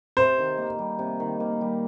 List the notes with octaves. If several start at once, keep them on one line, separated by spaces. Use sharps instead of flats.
C3 C5
D#3
A#3
G3
C3
D#3
A#3
G3